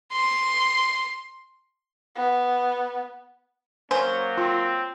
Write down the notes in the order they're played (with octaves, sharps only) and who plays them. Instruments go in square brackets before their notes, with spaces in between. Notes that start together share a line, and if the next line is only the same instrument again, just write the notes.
[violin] C6
[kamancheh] B3
[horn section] F#3 A#3 [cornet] C#4 [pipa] C5 [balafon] G#5
[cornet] C4 [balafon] F4